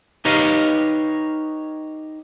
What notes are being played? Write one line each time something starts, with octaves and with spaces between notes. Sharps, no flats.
D#4 G4 B4 C#5 D#5 F5